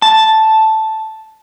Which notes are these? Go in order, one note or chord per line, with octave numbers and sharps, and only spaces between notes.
A5